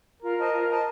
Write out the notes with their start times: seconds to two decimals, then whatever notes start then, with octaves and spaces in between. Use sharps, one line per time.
0.22 F4 A#4
0.38 C5 D#5 A5
0.54 F4
0.69 C5 D#5 A5